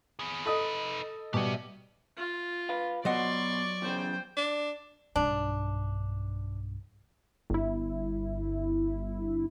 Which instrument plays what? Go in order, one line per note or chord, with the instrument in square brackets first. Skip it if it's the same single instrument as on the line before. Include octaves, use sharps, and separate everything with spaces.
[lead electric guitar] B3 G#4
[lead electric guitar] D#4 B4 [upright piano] A4 D#5 D#6
[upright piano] B2 G3 [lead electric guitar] G4 E5
[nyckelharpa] F4
[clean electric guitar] B4 F5
[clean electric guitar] B2 [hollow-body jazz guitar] F#3 D#5 F#5 [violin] D5 C#6 [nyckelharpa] C6
[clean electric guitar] E2 C#3 [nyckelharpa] C5 G5
[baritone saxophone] D4
[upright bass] B1 G2 [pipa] D4
[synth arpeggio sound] G1 E4